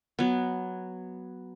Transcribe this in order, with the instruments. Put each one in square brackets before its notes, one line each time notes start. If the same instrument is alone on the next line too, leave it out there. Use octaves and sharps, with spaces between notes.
[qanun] F#3 B3